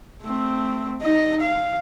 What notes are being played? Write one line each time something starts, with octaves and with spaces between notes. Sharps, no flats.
A3 C4
D#4 D#5
F5